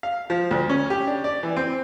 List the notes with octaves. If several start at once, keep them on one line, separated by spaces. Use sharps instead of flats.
F5
F3
D2
C#4
G4
D4
D5
E3
C4